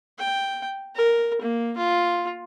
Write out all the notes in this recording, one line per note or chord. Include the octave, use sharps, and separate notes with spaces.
G5
A#4
A#3
F4